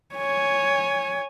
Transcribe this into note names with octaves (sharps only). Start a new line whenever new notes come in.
C#5 G#5